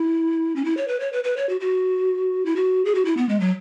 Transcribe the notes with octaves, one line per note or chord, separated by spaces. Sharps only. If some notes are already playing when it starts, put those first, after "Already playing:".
Already playing: E4
C#4
E4
C#5
B4
C#5
B4
B4
C#5
F#4
F#4
E4
F#4
G#4
F#4
E4
B3
G#3
F#3